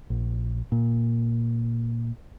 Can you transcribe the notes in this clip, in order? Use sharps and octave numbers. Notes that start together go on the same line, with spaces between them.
A#1
A#2